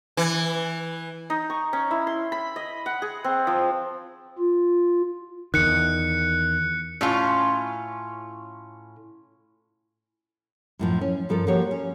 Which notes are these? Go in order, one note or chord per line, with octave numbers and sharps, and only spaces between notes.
E3
D#4
C#6
C#4
E4
C6
B5
D#5
F#5
G#4
C4
F3
F4
E2 D#3 F#6 C#7
A2 C#4 F4
F#2 A2 F3
C#4
G2 F3 A4 A#4
F3 A#3 F#4 G4 C#5
C#4